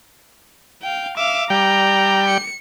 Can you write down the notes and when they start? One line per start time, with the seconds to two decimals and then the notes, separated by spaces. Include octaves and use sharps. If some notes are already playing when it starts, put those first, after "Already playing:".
0.82 F5 G5
1.17 E5 F5 D6
1.50 G3 D5 G5 A#5
2.28 C#7